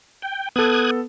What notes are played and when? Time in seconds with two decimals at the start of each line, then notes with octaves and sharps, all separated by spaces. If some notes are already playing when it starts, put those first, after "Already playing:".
0.22 G5
0.56 B3 A4 D#6 F#6 G#6